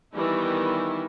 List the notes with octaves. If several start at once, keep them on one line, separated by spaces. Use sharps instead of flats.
D#3 E3 G3 B3 D#4 E4